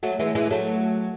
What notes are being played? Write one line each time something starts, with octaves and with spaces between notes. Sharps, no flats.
F#3 A3
E3 G#3
E3 G#3
F#3 A3